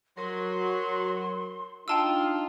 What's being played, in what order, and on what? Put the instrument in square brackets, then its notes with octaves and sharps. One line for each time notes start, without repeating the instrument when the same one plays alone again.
[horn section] F#3 [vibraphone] A#4 [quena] C6
[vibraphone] D4 [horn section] D#4 F4 [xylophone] G5 A5 E6